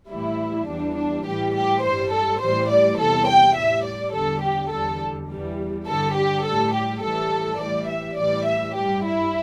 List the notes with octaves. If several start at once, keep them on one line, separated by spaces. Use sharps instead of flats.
A2 E3 G3 E4
E2 E3 G3 D4
D4
A2 E3 G3 G4
G4
G2 G3 C5
A4
A2 E3 G3 C5
D5
E2 C3 G3 A4
G5
A2 G3 E5
D5
E2 D3 G3 A4
G4
E2 D3 G3 A4
E2 E3 G3
G2 D3 G3 A4
G4
A2 G3 A4
G4
A2 E3 G3 A4
A2 E3 G3 D5
E5
A2 E3 G3 D5
E5
G2 G3 G4
E4